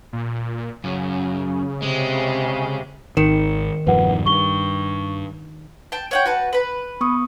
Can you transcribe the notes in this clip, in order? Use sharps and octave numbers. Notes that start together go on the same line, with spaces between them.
A#2
F#2 C#3
C3 G#3
G#1 D#3 C#7 E7
E1 G2 F3 B4 F#5
G2 C#6 G7
G5 A5
C#5 F#5 G5
F#4 B4 A5
B4 B5
B3 C#6 D#6